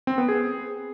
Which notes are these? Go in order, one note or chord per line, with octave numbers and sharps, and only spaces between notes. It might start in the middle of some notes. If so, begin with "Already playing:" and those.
C4
B3
G#4